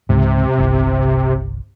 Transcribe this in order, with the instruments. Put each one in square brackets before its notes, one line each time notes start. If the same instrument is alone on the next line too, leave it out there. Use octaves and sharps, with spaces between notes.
[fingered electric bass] C#2 G#2 [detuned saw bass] C3
[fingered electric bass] G1 C2